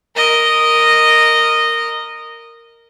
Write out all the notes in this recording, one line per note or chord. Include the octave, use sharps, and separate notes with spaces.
A#4 D#5